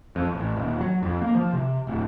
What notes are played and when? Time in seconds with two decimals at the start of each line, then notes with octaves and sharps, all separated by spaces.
0.16 F2
0.35 A1
0.56 D#1
0.81 F#3
1.03 F2
1.22 A#3
1.35 F3
1.53 C3
1.87 D1